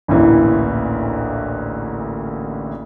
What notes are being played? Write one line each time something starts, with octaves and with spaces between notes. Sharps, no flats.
A1 D2 A#2 E3